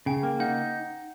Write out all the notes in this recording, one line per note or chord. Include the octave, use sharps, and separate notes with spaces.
C#3 G5
A#3
D#4 F#5